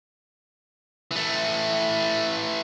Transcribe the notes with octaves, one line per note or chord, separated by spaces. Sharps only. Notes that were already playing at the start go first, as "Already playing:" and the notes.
E3 A3